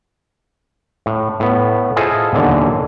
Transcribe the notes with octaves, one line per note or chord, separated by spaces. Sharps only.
A2
A2 B3
E4 F4 G#4 A4 C5 D#5
D#2 B2 D3 E3 F#3